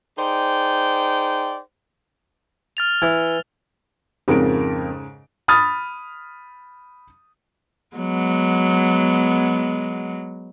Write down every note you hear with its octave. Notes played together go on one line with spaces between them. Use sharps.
D#4 G#4 C5 D5 G5
F6 A6 F7
E3
F2 G#2 C#3 C4 A#4 D7
B5 D#6 F6 A6
F#3 G#3 B3